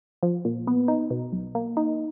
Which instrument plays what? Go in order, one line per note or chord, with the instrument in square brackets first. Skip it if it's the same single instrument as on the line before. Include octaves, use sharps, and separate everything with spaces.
[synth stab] F3
A#2
B3
D#4
B2
B1
A#3
D#4